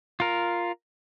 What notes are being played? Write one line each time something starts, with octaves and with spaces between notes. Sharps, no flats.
F4 A#4